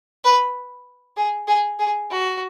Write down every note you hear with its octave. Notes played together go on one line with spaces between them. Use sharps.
B4
G#4
G#4
G#4
F#4